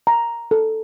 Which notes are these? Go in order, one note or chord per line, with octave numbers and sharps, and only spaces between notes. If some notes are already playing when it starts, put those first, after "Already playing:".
A#5
A4